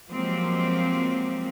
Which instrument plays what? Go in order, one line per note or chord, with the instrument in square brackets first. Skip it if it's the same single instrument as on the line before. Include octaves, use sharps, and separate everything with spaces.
[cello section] F3 F#3 G#3 A#3 C4 G4